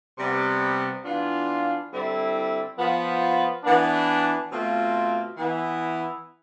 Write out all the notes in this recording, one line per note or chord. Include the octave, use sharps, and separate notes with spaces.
C3 G3 B3
E3 B3 D4 F4
D3 G3 C4 E4
F3 B3 F4
E3 B3 D4
B2 A3 C4 F4
E3 B3 E4